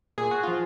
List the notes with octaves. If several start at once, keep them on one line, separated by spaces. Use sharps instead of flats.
A#2 G#4
F#4
F3 F4